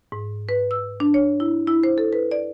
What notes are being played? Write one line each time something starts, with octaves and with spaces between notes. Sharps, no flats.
G#2
B4
E6
D4
C#5
E4
E4
C5
A4
B4
D5